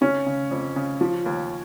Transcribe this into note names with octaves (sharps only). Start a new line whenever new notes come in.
C#3 C#4
C#3
F2
C#3
F3
D#2